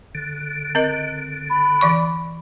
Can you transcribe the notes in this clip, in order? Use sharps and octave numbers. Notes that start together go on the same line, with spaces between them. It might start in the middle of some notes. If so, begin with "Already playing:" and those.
D3
C4 A#4 D#5
B5
E3 D5 C#6